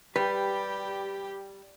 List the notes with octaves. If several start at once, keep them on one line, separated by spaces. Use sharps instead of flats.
G3 G4 B4